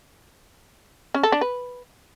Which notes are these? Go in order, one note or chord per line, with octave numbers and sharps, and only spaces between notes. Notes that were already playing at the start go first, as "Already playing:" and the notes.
C#4
A4
D4
B4